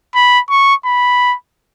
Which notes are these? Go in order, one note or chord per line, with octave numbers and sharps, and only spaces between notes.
B5
C#6
B5